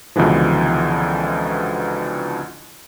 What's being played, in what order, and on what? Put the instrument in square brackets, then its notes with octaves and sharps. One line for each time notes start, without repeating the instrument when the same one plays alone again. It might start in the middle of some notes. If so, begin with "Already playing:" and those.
[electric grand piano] C#2 B2 D3 E3 F3